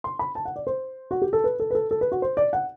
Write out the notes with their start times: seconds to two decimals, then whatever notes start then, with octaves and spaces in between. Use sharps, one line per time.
0.04 C6
0.19 B5
0.35 A5
0.45 F#5
0.56 D5
0.67 C5
1.11 F#4
1.22 G4
1.33 A4
1.44 B4
1.60 A4
1.70 B4
1.75 A4
1.91 A4
2.01 B4
2.12 F#4
2.22 C5
2.37 D5
2.53 F#5